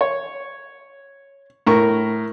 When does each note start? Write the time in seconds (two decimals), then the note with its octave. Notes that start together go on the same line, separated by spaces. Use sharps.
0.01 C#5
1.67 A2 A#4 A#5 C#6